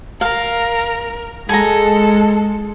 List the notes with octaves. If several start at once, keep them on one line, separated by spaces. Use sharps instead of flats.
A#4 F5
G#3 A4 G#5 A#5